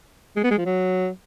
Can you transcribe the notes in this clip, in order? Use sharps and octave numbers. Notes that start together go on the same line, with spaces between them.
G#3
B3
G#3
F3
F#3